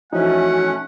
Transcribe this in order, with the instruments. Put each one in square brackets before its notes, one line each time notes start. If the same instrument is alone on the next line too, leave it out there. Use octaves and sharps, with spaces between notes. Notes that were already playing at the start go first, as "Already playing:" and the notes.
[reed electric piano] E3 F3 D#4 [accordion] A3 C#4 [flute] F#4 [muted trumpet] F#5